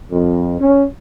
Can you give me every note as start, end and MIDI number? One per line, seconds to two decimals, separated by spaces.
0.11 0.58 41
0.59 0.84 61